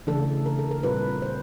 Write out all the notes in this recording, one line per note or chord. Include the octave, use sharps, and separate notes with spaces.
C#3 E3 A3 D4 A4
A#4
A4
A#4
A#2 G3 C4 F4 B4
C5